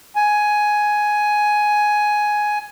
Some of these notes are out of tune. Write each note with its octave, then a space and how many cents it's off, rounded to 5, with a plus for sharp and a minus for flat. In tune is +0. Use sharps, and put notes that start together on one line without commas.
G#5 +10